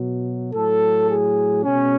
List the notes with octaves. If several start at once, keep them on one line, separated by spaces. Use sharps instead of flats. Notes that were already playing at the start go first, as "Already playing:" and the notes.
Already playing: B2 F#3
A2 F#3 A4
G#4
B2 G#3 C#4